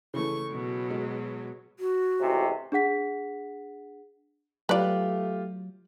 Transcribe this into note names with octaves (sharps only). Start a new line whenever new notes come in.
C#3 E3 A3 C#6
B2 F#3
G#3
F#4
A1 G#2 C3
D4 G#4 F#5 B6
F#3 A3 F4 G4 B4 D5